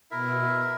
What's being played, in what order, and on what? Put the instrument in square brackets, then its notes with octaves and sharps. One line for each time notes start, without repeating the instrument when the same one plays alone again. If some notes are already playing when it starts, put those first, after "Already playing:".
[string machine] B2 [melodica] E4 A#4 E5